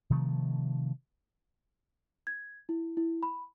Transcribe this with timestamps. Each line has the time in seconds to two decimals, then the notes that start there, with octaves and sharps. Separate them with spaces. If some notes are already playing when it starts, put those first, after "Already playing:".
0.10 C3 D#3 F3 A3
2.27 G#6
2.69 E4
2.97 E4
3.23 B5